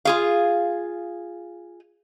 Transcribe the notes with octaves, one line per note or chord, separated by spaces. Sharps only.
F4 G#4 F5